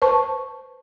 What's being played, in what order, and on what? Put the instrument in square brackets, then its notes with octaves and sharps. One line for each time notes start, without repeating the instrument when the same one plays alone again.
[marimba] B4 C5 A5 C#6